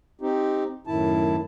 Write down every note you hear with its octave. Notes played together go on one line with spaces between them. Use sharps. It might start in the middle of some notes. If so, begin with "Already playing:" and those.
C4 D#4 G4
F#2 A2 D#3 E4 A5